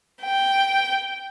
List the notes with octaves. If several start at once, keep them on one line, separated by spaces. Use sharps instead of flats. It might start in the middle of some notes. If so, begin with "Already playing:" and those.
G5